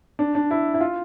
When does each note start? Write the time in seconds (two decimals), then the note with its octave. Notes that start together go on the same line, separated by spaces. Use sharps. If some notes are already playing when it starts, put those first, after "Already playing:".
0.19 D4
0.35 D4
0.51 E4
0.74 E4
0.80 F4